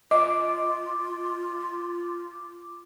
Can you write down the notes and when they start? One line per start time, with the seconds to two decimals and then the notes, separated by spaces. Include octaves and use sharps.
0.11 F4 D#5 D6